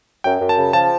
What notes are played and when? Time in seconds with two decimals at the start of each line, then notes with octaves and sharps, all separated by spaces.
0.24 F#2 G5
0.41 F#2
0.49 A5
0.57 C#3
0.73 F3 A5